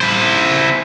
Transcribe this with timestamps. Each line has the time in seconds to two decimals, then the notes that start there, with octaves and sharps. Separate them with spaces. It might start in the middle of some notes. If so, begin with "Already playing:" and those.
0.01 E4 C5